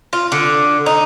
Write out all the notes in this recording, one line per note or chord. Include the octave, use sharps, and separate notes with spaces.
F4
D3
D#4